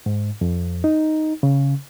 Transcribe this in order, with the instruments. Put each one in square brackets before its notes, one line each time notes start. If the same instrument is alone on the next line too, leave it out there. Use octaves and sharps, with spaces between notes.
[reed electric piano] G#2
F2
D#4
C#3